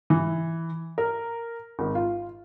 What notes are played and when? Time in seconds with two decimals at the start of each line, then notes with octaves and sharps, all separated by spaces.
0.10 E3
0.98 A#4
1.79 G#1
1.95 F4